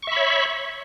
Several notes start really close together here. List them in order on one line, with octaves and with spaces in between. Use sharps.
C#6 E5 B5 C#5